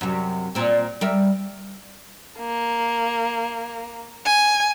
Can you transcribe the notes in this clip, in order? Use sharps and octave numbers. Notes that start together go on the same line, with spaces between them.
F#2 C3
A#2 C4
G3 A#4 E5
A#3
G#5